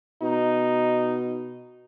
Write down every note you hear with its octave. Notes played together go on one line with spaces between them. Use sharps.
B2 D#4